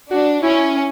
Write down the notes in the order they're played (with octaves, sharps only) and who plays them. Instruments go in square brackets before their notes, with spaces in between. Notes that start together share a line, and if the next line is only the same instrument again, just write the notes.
[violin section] D4 [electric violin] F#4
[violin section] C#4 [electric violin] E4